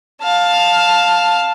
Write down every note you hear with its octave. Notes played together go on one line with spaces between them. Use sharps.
F5 A5